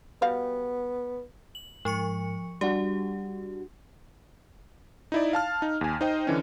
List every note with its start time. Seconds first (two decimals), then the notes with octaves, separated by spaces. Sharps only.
0.22 G3 B3 F#4 F5
1.55 F#7
1.85 G#2 F3 C#6 C#7
2.61 G3 D4 F#4 G4
5.12 D#4 E4 D5
5.33 F5 A5 F6
5.62 D#4
5.81 D#2 G#5
6.01 D#4 C5 D#5 G5
6.27 D3 E3 C#4